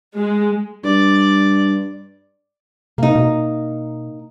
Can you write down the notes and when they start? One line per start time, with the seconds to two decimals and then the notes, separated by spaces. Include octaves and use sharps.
0.16 G#3
0.84 G2 D5
2.98 C3 A#3 D#4
3.16 B2